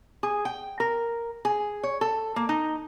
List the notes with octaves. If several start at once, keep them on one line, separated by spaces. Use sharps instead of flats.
G#4
G5
A#4
G#4
C#5
A4
A#3
D#4